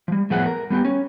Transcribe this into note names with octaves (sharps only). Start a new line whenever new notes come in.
F3 G3
A2 F3 A3 B3 G#4 F#5
A#4
G3 B3 F4 G4
C#4